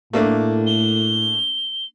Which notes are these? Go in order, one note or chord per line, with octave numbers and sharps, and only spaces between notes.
A2 A3 A#3 D4
G7